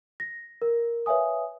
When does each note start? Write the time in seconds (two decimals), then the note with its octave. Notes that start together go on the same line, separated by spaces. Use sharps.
0.20 A#6
0.62 A#4
1.06 B4 C#5 E5 F5 G#5 D#6